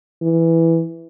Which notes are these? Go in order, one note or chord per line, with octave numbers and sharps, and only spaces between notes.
E3